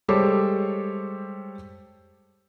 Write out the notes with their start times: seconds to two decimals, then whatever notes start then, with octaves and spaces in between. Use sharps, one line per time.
0.08 G3 G#3 G4 A4 C5 C#5